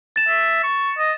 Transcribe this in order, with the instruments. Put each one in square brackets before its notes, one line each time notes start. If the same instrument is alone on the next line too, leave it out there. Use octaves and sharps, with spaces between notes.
[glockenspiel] A6 E7
[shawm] E5
C#6
D#5